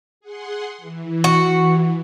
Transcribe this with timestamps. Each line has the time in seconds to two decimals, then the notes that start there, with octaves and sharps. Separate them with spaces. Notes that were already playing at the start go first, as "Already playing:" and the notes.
0.20 G#4 F#5 C6
0.78 E3
1.24 F#4